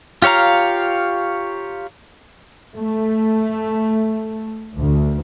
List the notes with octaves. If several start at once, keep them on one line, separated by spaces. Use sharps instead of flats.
F4 G4 C#5 F5 A#5
A3
D2